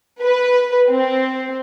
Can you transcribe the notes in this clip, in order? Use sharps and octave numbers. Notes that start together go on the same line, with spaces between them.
B4
C4